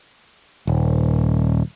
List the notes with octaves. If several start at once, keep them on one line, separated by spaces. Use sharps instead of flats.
D#1